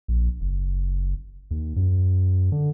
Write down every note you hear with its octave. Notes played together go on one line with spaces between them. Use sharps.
A#1
F#1
D#2
F#2
D3